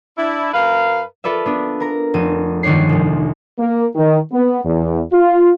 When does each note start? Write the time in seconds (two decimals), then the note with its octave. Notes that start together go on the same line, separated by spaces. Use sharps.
0.17 D4 E4
0.53 F#2 A#4 B4 F5
1.24 F4 A4 B4 D5 E5
1.46 B3 D4
1.80 A#4 A#5
2.14 F1 C4 D#7
2.63 G1 D#3 G#3 D4 C#5 C7
2.89 F1 C2
3.58 A#3
3.95 D#3
4.33 B3
4.65 E2
5.13 F4